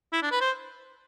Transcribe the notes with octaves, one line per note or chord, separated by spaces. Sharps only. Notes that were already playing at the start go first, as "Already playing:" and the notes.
E4
D4
B4
C5